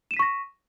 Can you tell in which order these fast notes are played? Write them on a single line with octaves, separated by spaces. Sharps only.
E7 D#7 B6 C#6 A#6